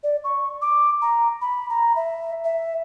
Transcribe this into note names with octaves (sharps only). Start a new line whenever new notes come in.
D5
C#6
D6
A#5
B5
A#5
E5
E5